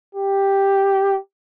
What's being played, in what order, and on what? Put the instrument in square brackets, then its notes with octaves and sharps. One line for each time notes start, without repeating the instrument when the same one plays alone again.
[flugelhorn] G4